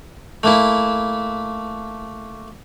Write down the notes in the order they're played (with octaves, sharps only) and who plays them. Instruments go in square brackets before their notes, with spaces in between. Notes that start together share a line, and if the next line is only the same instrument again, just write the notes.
[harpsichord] A3 A#3 E4